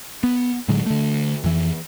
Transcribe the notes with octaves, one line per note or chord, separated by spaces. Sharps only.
B3
A2 D3 F#3 G#3
D3 A3
F2 E3